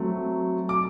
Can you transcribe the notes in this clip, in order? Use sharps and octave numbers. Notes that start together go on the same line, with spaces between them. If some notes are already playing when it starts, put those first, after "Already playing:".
Already playing: F#3 A3 C4
D6